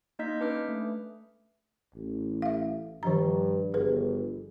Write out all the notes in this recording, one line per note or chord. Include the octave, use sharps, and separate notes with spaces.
A#3 D#4 D#5 G6 B6
C#4 D4 B4 D6 F6
A3
A1
E5 F5
G2 D#3 F3 A#5
G1 G#4 B4